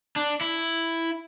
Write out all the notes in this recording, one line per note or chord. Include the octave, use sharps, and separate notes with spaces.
D4
E4